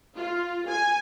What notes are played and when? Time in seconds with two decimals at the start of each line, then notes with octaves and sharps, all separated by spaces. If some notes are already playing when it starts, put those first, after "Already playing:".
0.17 F4
0.69 G#5